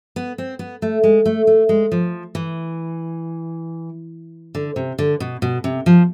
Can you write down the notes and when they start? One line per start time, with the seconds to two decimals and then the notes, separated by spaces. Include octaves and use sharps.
0.16 B3
0.38 C4
0.59 B3
0.82 A3
1.04 G#3
1.26 A3
1.47 A3
1.69 G#3
1.92 F3
2.35 E3
4.55 D3
4.76 C3
4.99 D3
5.20 B2
5.42 B2
5.64 C3
5.86 F3